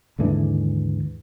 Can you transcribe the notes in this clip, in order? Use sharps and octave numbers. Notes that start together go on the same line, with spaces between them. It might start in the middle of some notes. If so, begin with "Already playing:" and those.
D#2 G#2 D3 E3